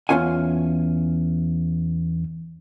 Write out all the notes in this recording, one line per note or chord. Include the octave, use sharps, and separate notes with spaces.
E2 G#2 C#4 F4 F#5 G#5